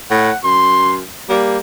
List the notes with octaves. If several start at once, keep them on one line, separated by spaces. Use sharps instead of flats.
A2 F#5
F#2 C6
G3 A#3